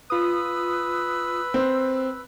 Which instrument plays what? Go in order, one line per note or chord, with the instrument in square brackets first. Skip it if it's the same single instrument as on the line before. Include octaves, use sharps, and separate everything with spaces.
[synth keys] F4 D#6 [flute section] B4 E6 F#6
[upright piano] C4